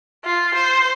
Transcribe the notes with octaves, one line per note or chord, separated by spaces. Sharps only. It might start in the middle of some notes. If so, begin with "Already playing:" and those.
F4
C5